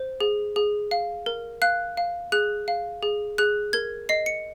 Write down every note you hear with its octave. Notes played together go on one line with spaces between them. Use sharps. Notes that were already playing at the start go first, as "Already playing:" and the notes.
Already playing: C5
G#4
G#4
F5
A#4
F5 F#6
F5
G#4 F#6
F5
G#4
G#4 F#6
A#4 G#6
D#5 C7
C#7